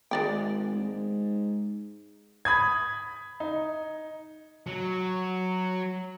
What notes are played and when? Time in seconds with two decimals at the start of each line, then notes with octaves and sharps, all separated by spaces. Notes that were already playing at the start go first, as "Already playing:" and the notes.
0.11 G#1 G#3 D5 G5
0.74 G#2
2.45 B5 D#6 G#6
3.40 D#4
4.66 F#3